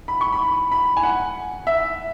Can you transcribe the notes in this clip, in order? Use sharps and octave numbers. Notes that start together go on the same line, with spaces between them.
B5
C#6
B5
B5
G#5
F#5
E5